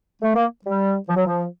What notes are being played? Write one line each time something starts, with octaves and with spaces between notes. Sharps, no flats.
A3
A#3
G3
F3
F#3
F3